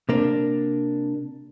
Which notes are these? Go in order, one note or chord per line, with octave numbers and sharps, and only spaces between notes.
C3 A#3 D4